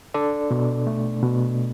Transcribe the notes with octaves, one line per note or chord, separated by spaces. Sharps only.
D4 A4 D5
B2
A3
B2